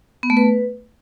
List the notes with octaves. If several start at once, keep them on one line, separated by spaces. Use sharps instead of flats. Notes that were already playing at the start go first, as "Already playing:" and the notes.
B3
A3
B4